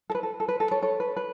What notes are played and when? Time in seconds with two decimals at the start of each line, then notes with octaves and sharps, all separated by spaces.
0.10 A4
0.15 B4
0.23 A4
0.40 A4
0.48 B4
0.60 A4
0.71 A4 C#5
0.82 A4 C#5
1.00 B4
1.17 B4